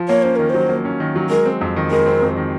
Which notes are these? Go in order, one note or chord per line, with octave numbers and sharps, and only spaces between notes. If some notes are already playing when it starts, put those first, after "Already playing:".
Already playing: F3
A#3 C#5
C#4 C5
D#3 A#4
F#3 C5
A#3
C#4
D#3
F#3
G#3 A#4
C4
F2
D#3
G#3 A#4
C4
F2
D#3